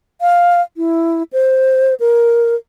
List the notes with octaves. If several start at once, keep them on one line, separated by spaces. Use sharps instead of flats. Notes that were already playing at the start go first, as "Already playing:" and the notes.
F5
E4
C5
A#4